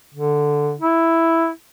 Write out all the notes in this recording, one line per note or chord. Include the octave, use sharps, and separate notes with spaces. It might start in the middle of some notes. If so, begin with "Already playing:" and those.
D3
E4